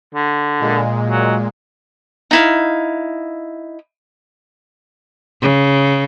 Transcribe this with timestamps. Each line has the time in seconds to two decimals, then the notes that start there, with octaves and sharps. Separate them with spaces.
0.15 D3
0.59 A#2 G#3
1.07 F#3
2.31 D#4 E4 F5
5.41 C#3